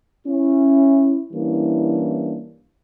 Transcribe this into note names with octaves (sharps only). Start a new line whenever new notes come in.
C#4 E4
E3 G3 A#3 C#4 D4 E4